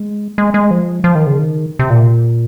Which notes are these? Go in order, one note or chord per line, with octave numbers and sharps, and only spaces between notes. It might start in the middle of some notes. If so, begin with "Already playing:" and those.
Already playing: G#3
G#3
G#3
F3
F3
D#3
C#3
D#3
C3
A#2